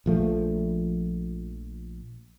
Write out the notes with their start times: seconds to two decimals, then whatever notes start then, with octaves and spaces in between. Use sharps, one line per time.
0.06 A#1 F3 A3